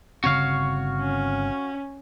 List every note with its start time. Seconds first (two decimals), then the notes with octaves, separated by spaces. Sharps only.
0.24 G1 C#3 C4 F#4 C#5 F5
1.01 C#4